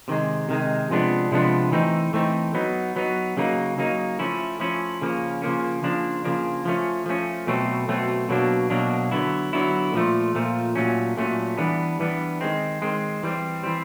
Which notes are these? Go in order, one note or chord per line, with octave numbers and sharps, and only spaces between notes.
C3 D#3 G#3
C3 D#3 G#3
C3 F3 G#3 B3 D4
C3 F3 G#3 B3 D4
E3 A3 C4 D#4
E3 A3 C4 D#4
F#3 B3 D#4
F#3 B3 D#4
C#3 F#3 A#3 D#4
C#3 F#3 A#3 D#4
F3 A3 C#4 E4
F3 A3 C#4 E4
C#3 F3 A#3 C#4
C#3 F3 A#3 C#4
C#3 F3 A#3 D4
C#3 F3 A#3 D4
F3 A3 C#4
F3 A3 C#4
B2 F#3 A3 C4
B2 F#3 A3 C4
B2 F#3 A#3 D4
B2 F#3 A#3 D4
D3 F#3 B3 E4
D3 F#3 B3 E4
A#2 F3 A3
A#2 F3 A3
A#2 F#3 A3 C#4
A#2 F#3 A3 C#4
E3 G3 B3 D4
E3 G3 B3 D4
D#3 G#3 C4
D#3 G#3 C4
E3 G3 C4
E3 G3 C4